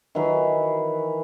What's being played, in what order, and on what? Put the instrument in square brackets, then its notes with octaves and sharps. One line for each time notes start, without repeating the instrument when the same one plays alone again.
[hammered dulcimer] D#3 E3 F#3 B4